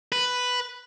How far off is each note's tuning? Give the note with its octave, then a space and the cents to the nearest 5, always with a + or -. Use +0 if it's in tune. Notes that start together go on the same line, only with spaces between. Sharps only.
B4 +5